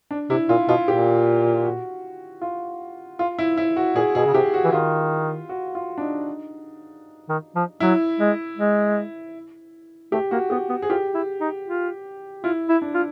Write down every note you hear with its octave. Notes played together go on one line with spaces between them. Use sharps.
D4
C3 E4
A#2 F4
B2 F4
A#2 G4
F#4
F4
F4
E4
E4
F#4
A#2 G#4
B2 G#4
C#3
C3 G4
F#4
E3
D#3 F4
F#4
F4
D4
D#4
D#3
F3
F#3 E4
G#3
G#3
A3 G4
A#3 F#4
B3 G4
B3
G#4
F4 G4
E4
D#4
F4
E4 F4
E4
D4
F4